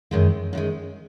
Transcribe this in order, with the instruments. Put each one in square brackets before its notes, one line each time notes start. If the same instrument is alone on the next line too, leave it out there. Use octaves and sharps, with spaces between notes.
[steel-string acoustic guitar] F#2 D#3 G#3
F#2 D#3 G#3